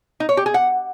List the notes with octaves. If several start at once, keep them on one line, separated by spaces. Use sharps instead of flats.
D#4
C#5
G4
G#4
F#5